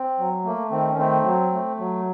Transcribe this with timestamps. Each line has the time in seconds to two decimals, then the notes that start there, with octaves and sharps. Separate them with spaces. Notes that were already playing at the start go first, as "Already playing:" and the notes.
Already playing: C4
0.19 F#3
0.44 A3 A#3
0.71 D#3 C4
0.90 C#4
0.98 A3 C4
1.24 F#3
1.52 A3
1.78 F#3